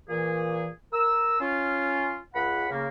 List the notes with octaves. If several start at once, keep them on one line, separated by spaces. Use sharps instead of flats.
A#2 E3 G#4
A#4 E6
C#4 F4
C#2 F#5 B5
C#3 A#3